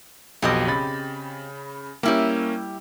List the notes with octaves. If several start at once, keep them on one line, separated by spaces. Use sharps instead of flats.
B1 F2 B2 C4 G4 D#5
C#3 B5 A6
G3 A#3 C#4 E4 G4